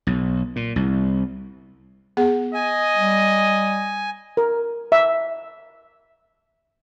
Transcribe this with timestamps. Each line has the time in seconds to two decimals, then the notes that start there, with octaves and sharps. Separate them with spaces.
0.07 B1
0.56 A#2
0.76 C2
2.17 B3 G#4 F#5
2.54 D#5 G#5
2.97 G3
4.37 A#4
4.92 E5